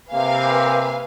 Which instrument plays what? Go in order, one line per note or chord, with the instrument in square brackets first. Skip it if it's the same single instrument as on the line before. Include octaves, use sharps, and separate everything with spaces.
[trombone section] C3 A#3 [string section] B4 F5 G#5